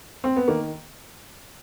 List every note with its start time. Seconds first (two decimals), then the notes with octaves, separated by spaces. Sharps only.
0.24 C4
0.36 B3
0.48 D#3 A#3